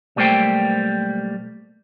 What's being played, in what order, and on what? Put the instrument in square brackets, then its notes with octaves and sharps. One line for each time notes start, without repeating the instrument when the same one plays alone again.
[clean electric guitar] B1 G3 A3 A#3 C5 G5